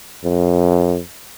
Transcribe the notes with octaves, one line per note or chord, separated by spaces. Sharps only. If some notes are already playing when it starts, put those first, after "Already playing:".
F2